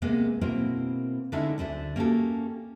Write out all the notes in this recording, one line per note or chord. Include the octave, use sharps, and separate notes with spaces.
C3 G#3 A#3 B3
B2 A#3 C4 E4 A#4 C5
D3 G#3 C#4 D#4 E4 A4
D2 D3 C5 E5
A#3 C#4 F#4 G4 A4